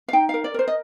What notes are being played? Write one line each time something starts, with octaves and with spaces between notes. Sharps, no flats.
F5
D#4 G5
A#4 F5
D5
A#4 C5
D#5